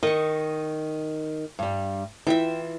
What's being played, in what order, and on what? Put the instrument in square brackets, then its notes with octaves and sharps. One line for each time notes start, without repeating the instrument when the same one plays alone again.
[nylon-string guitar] D#3 [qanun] D#5 C#6
[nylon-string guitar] G2 G3
[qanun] E3 F4 E5 [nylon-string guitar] G5